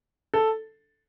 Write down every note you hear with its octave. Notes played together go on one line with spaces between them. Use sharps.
A4